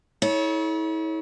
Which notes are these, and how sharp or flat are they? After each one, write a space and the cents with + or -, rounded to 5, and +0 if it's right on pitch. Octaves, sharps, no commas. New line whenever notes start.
E4 -40 A4 -30 C#5 +0